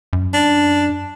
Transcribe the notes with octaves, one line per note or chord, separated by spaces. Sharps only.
F#2
D4